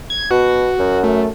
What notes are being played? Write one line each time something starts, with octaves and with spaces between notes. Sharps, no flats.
G#6
B2 F#4
F#2
A3